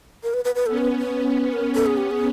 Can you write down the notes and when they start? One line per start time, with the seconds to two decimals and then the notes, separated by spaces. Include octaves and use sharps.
0.23 A#4
0.34 B4
0.45 B4
0.55 B4
0.66 B3 C#4 A4
0.77 B4
0.99 B4
1.10 B3 C#4
1.53 B3 C#4 A#4
1.75 A4
1.86 G#4
1.97 G4
2.11 G#4